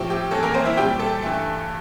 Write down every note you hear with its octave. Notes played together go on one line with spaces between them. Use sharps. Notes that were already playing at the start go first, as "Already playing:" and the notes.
Already playing: A2 F3 C4 G4
G4
A2 E3 A#3 A4
A#3 A#4
C4 C5
E4 E5
A#2 G3 C4 G4 G5
A4 A5
G2 E3 A3